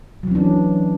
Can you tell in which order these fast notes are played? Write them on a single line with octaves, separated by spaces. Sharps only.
F#3 E3 C#4 D4